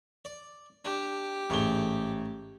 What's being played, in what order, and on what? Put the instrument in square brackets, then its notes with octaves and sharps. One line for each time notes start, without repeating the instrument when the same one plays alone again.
[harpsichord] D5
[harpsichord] D4 [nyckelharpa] G4
[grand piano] A1 G7 [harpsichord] G#2 A3